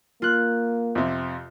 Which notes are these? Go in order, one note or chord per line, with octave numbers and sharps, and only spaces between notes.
A#3 F4 F#6
F2 C3